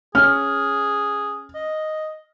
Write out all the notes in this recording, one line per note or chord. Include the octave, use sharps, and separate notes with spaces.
C#4 G#4 F6
D#5